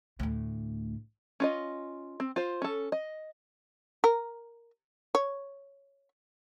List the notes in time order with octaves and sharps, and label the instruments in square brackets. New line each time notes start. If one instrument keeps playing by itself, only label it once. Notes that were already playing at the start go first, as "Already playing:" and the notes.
[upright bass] D2 A2
[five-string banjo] C#4 F4 D#5
C4
F4 C5
C#4 A4
D#5
[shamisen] A#4
C#5